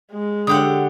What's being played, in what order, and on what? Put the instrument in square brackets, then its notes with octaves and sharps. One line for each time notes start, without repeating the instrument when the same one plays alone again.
[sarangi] G#3
[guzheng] D3 G4 F#5 [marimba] D#6